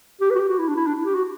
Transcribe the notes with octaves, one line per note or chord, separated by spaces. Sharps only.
G4
B4
F#4
G4
F#4
E4
D4
E4
D4
E4
G4
F#4